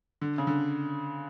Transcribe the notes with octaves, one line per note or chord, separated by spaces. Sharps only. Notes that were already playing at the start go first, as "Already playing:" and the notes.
D3
C#3
D3